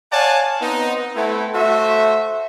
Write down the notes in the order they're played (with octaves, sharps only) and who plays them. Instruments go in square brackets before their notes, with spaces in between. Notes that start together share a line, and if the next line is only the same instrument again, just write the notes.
[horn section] C#5 D5 F5 F#5 G#5 A5
B3 C4 D#4
A3 B3 C4 E4
A3 F#4 C5 E5